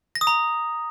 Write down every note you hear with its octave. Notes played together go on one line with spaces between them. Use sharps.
A#6
D#6
A#5